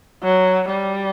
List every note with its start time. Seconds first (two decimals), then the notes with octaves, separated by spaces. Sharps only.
0.23 F#3
0.70 G3